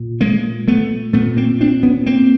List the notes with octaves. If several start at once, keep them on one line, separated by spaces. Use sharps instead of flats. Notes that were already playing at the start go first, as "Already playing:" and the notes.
Already playing: A#2
G#3 A#3
A3 B3
A#2 A3 B3
A#3 C4
C4 D4
B3 C#4
A#3 C4